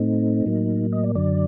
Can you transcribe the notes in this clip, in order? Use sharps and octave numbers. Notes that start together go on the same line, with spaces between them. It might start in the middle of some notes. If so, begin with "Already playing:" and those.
Already playing: A2 A3 C4 D#4
A2 F#3 A#3
D#5
D5
F#2 D3 F#3 D5